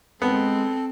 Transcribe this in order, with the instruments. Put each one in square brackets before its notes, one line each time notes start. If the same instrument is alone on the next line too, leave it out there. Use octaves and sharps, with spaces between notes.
[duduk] G#3 [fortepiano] B3 [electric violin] C4 [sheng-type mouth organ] A4